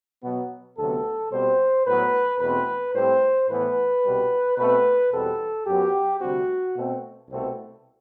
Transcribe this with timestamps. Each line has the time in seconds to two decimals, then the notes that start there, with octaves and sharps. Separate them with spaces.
0.23 B2 F#3 B3
0.78 D2 C3 F#3 B3 A4
1.32 B2 G3 C4 C5
1.87 A2 F#3 B3 B4
2.40 E2 B2 A3 C4 B4
2.95 A2 G3 C4 C5
3.50 A2 E3 B3 B4
4.03 C2 B2 G3
4.58 B2 A3 C4 B4
5.12 E2 B2 G3 C4 A4
5.66 F#2 F#3 B3 G4
6.21 D2 C3 G3 C4 F#4
6.76 B2 A3 C4
7.29 C2 B2 A3 C4